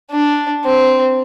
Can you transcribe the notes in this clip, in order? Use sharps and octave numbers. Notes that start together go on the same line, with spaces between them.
D4
C4